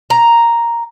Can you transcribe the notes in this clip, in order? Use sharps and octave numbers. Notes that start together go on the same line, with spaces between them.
A#5